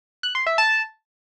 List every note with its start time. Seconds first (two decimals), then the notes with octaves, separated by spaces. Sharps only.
0.23 F#6
0.35 C6
0.46 E5
0.58 A5